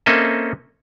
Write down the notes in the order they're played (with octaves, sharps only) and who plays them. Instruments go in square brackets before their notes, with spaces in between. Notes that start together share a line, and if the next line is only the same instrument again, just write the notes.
[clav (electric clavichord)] A#3 C4 C#4 A4 D#5 E5